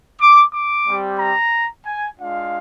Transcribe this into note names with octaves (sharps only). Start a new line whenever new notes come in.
D6
D6
G3 C4 G4
A#5
G#5
G#3 D4 F4 F5